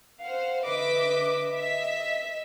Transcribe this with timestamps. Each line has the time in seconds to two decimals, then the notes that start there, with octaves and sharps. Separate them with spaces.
0.22 C5 F5 F#5
0.66 D3 B4 D#5 E5 D6 B6
1.52 D#5 E5 B6